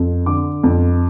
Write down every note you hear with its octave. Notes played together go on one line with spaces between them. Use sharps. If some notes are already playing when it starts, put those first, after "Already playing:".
Already playing: F2
D3 D6
F2